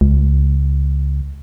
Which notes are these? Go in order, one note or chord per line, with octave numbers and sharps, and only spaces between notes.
C#2